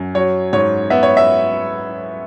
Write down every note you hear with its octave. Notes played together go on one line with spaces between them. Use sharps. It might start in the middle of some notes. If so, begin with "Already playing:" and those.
Already playing: F#2
F#3 C#5
G#2 C#5
B3 E5
C#5
E5